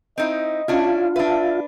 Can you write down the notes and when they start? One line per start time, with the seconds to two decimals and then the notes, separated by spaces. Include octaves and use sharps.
0.18 C4 D#4 E4 D#5
0.68 C#4 D4 E4 F4
1.16 D4 B4 E5